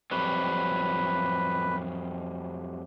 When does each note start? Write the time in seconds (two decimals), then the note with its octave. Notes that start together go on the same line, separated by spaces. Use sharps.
0.11 F2 F#3 G3 B4